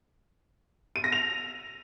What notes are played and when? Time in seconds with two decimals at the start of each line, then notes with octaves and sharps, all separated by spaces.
0.96 D#7
1.04 A#6
1.12 F7